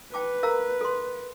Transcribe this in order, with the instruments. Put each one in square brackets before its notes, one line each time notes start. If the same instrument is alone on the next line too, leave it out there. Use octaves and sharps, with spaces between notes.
[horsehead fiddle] B4 [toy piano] G5 A5 D6
[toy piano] A#4 F5 A#5
A4 C6